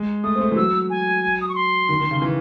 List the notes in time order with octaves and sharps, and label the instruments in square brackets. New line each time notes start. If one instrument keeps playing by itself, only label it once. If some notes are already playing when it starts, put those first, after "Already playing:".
Already playing: [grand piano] G#3
[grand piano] A3 [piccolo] D#6
[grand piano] C4
A3
E3
[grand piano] F#3 [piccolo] E6
[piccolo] G#5
D#6
C#6
C6
[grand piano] D#3
D#3
C#3
E3